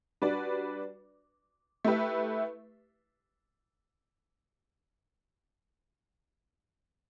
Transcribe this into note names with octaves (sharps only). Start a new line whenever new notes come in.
G3 D4 F#4 B4 D5
A3 E4 G4 B4 E5